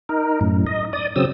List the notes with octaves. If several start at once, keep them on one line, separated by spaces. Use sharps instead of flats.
D#4 A#4
F#2 A2
D#5
D5 D#6
C#3 F#3 C4 D#6 E6